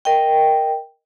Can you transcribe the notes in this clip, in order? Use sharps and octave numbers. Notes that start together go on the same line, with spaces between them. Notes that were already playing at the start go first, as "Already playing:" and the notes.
A#4 D#5 G5